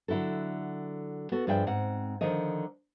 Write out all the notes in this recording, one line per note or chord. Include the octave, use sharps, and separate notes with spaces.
D3 F#3 E4 F#4 A4
B3 F#4 A4
G2 F3 G#4 D5 E5 G5
G#2 C4 F#5
D3 D#3 F3 C#5 D#5